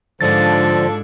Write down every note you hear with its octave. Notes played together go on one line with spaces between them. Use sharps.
G#2 D3 F3 D4 F4 A4 G#6 A6